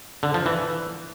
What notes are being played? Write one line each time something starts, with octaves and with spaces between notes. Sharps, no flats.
D3
F3
E3